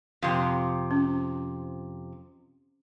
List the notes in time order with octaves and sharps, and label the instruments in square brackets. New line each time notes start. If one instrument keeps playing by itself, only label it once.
[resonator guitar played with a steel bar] F2 C3
[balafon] C#4